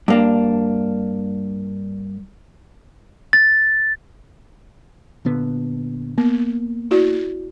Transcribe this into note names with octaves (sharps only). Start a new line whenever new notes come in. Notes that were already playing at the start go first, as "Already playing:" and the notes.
G2 A#3 D4
A6
A#2 D3 B3
A#3 B3
E4 F#4 D5